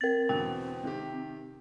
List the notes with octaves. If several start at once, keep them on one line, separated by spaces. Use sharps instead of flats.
C4 A#4 A6
E2 B2 D3 G5
C3 D#3 G4